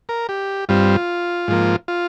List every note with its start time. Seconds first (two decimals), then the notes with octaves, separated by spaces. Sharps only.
0.09 A#4
0.29 G4
0.69 G2 G3 C4 F4
1.48 G#2 F3 A#3
1.88 F4